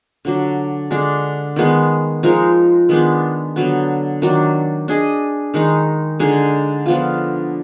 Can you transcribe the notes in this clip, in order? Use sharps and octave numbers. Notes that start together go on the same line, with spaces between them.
D3 F#3 D4
D3 G#3 D4
D#3 G#3 B3
F3 G#3 D#4 A#4
D#3 G#3 B3 D4
D3 F#3 B3
D#3 F#3 D4
D4 G#4 D#5
D#3 G#3 D#4
D3 G#3 D#4 G#4
F3 B3 F4